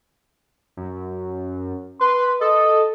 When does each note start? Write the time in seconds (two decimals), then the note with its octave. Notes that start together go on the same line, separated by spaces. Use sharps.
0.77 F#2
2.01 B4 C6
2.41 A4 D#5